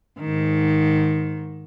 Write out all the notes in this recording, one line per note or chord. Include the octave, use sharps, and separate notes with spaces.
G#2 D#3